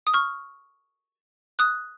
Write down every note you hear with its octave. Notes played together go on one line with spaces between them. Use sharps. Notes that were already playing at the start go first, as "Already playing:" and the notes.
D#6
C#6 F6
D#6 F#6